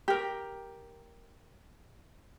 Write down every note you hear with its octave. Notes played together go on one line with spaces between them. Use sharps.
G4 A#4